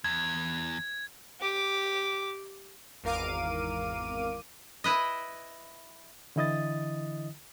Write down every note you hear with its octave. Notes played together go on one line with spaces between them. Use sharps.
E2 G#6
G4 D6
G#1 E2 A#4 F5 D6 D#7
E4 B4 D#5
D3 E3 E4 D#5 D#6 A6